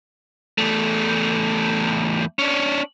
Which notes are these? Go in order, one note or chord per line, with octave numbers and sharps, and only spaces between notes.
E2 A3
C#4 D4